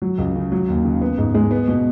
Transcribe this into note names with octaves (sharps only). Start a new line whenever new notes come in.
F#3
C#2
C#3
F#3
D#2
C#3
B3
G#2
G#3
B3
B2